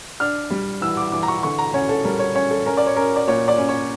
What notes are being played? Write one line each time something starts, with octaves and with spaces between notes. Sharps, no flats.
D4 F6
G3
E3 E6
D6
E3 D6
A#5
C#6
D3 C#6
A#5
C#4 C#5
A4
G3 A#4
C#5
C#4 C#5
A4
C#4 A#4
D5
C#5
C#4 A#4
D5
A#2 C#5
D5
C#4
C#5